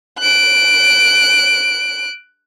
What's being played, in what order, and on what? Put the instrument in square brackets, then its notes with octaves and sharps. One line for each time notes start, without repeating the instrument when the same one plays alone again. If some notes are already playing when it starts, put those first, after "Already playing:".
[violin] F#6 D7